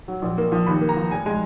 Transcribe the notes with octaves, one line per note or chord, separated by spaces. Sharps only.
F#3
A#1
A#3
F3
D#2 B5
A#3
A#5
F3
F1 G#5
G#3 G#5